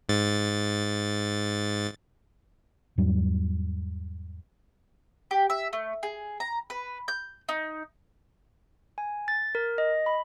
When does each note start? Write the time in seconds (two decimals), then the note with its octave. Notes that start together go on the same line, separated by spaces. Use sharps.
0.09 G#2 A6
2.98 E2 G#2 F#3 G3
5.31 G4
5.50 E5
5.73 A3
6.03 G#4
6.40 A#5
6.70 B4
7.08 G6
7.49 D#4
8.98 G#5
9.28 A6
9.55 A#4
9.78 D#5
10.06 B5